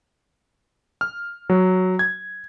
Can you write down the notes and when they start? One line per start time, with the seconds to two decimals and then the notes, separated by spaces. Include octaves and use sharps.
1.01 F6
1.50 F#3
1.99 G#6